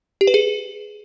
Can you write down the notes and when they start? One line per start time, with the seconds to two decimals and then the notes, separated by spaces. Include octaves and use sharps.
0.21 G4
0.27 B4
0.34 G#4